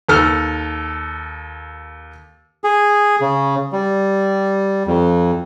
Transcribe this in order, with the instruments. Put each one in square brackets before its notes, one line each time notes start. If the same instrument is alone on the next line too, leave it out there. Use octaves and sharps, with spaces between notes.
[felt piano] D#2 A4 F6
[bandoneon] G#4
C#3
G3
F2